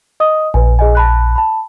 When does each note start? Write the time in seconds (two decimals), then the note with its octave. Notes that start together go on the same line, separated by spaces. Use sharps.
0.20 D#5 D#6
0.54 A#1 B4 G#5
0.79 G#4 D#5 G#5
0.95 A5 B5 F#6
1.36 A5 B5